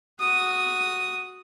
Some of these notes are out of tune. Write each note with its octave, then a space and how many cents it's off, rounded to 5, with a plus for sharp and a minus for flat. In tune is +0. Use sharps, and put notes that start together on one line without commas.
F#4 +0 D#6 +0